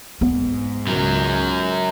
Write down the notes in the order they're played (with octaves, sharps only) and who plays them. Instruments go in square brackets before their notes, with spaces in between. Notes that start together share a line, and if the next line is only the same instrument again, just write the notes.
[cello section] G#2 [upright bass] B3
[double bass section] C#2 [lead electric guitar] F#2 F#3